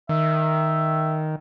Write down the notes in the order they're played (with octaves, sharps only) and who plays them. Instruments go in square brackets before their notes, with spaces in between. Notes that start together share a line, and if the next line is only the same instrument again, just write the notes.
[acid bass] D#3 [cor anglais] E5